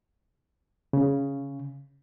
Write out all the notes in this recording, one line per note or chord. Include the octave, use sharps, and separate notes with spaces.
C#3